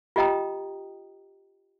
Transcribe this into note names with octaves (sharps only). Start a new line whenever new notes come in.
F4 G4 D#5 G5 A#5 D#6